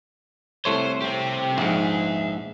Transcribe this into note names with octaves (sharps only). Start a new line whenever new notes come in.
C2 A3 C5 C#5
C4 G4
A#1 G#2 E5 F#5